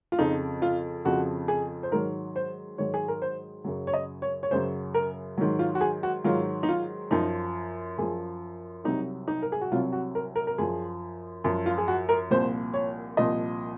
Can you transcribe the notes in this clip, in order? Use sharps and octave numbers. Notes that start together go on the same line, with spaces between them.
F4
F2 C#3 F3 D#4
F4
F2 C#3 F3 F#4
G#4
C5
G#2 D#3 F#3 A#4
C5
G#2 D#3 F#3 C#5
G#4
A#4
C5
F#2 C#3 F#3
C#5
D#5
C#5
C#5
F#2 C#3 F#3 C5
A#4
G#2 D#3 F#3
F4
F#4
G#4
F#4
G#2 D#3 F#3 F4
D#4
F4
F#2 F3 D#4
F#2 F3 G#4
C2 C3 F#3 D#4
D#4
A#4
G#4
F#4
C2 C3 F#3 F4
F#4
A#4
A#4
A#4
F#2 F3 G#4
F#2 F3
F4
G#4
F#4
A#4
C2 A#2 F3 C5
C#5
C2 A#2 F3 D#5